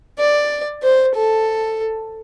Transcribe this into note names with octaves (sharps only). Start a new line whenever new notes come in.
D5
C5
A4